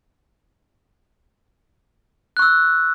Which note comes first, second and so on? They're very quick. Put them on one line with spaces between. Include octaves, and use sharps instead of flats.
F#6 C#6 E6